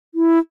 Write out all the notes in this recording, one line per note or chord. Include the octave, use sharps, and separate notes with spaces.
E4